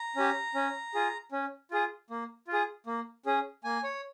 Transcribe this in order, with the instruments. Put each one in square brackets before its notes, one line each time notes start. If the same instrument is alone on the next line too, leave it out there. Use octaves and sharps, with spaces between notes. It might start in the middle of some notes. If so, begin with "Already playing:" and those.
Already playing: [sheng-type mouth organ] A#5
C#4 G4
C#4
F4 G#4
C#4
F4 G#4
A#3
F4
G#4
A#3
C#4 G#4
A#3 G#5
C#5